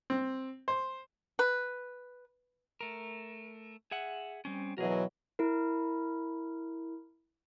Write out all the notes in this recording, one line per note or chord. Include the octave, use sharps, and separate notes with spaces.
C4
C5
B4
A3 A#4
G#4 E5 F#5
G3 C4 C#4
B2 E3 F#3 G#4 A#4
E4 A#4